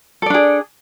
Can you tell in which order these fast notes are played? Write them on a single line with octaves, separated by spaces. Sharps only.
A4 D5 D4 G#4